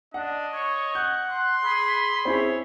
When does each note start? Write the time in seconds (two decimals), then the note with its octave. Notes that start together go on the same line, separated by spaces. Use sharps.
0.14 D4 D#5 F#5
0.53 C#5 C#6
0.95 F#5 G6
1.29 C6 F#6
1.63 G#4 B5
2.25 C4 E4 G#4 C#5